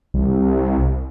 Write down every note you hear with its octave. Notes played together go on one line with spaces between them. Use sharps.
C2